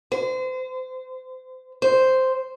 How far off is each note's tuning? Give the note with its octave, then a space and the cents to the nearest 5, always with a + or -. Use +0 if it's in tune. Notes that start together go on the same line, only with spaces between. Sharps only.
C5 -30
C5 -5